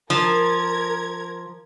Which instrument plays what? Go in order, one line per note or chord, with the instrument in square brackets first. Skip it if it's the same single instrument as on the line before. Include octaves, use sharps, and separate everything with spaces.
[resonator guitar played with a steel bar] F3 [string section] A#4 G#6